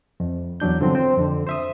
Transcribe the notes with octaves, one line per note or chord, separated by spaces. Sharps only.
F2
E2 F#3 D4 G6
G2 D3 F3 F#3 C4
C4
F2 D3
C5 E5 D#6